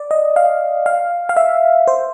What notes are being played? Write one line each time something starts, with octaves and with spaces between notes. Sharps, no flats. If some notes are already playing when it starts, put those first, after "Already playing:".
Already playing: D5
D#5
F5
F5
F5
E5
C5